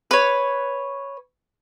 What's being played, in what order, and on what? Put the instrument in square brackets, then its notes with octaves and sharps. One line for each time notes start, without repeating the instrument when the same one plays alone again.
[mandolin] B4 C#5